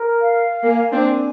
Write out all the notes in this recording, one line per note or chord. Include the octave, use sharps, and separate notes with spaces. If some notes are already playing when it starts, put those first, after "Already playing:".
Already playing: A#4
F5
A#3 G#5
C4 D4
G#5